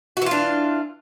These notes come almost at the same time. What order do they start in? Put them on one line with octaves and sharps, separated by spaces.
F#4 E3 F4 D4